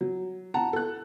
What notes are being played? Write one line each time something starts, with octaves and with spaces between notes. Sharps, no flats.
F#3
F#5 A5 A#5
A4 F#6